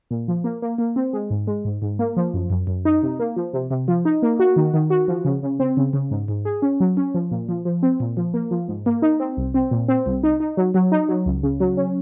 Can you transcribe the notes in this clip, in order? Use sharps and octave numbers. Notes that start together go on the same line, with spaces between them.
A#2
F3
A#3
A#3
A#3
C4
G#3
G#2
G#3
G#2
G#2
A#3
F3
F#2
F#2
F#2
D#4
C3
A#3
F3
C3
C3
F3
D#4
A#3
F#4
D#3
D#3
F#4
F3
C#3
C#3
C4
C#3
C#3
G#2
G#2
G#4
C#4
F#3
C#4
F3
A#2
F3
F3
C4
A#2
F3
A#3
F3
G#2
A#3
D#4
C4
C2
C4
A#2
C4
C2
D#4
D#4
F#3
F#3
D#4
F#3
C#2
C#3
F#3
C#4